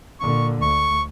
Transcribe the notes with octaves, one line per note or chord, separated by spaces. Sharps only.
A#2 D3 C#6
D2 C#6